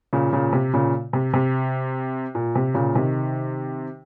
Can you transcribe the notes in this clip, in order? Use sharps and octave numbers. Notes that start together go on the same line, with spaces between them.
A#2 C#3
A#2 C#3
C3
A#2 C#3
C3
C3
A#2
C3
A#2 C#3
C3 D#3